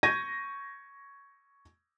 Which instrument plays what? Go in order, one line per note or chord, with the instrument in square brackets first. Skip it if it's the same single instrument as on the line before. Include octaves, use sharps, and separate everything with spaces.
[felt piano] C#6 G6 G#6 A#6 D#7